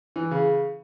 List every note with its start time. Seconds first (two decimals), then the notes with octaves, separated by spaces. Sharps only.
0.16 E3
0.31 C#3